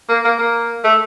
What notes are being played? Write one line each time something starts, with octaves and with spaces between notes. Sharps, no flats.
A#3
A#3
A#3
A3